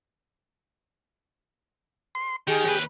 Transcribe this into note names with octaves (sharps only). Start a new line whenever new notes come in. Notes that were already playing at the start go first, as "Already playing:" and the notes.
C6
D#3 G4 G#4
D#2 B4